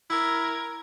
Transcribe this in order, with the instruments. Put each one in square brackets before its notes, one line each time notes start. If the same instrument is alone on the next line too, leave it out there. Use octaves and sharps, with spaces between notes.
[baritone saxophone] E4 [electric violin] A#4 G#6